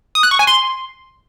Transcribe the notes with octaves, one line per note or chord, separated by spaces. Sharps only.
D#6
F#6
C#6
G#5
C6